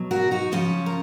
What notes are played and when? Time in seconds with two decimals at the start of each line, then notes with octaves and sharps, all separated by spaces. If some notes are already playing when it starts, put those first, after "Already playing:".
Already playing: B2 F#3
0.11 F#4 A#4
0.31 D#4 F#4
0.52 C#3 F3 C#4 F4
0.86 A#4